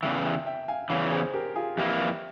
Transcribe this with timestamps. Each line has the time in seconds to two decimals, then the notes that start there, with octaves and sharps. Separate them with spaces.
0.02 E2 C#3 E3 E5 G5
0.25 E5 G5
0.46 E5 G5
0.68 F5 G#5
0.90 E2 C#3 E3 C#5 F5
1.12 G#4 C5
1.33 G4 A#4
1.55 F4 G#4
1.77 F2 E3 A#3 E4 G4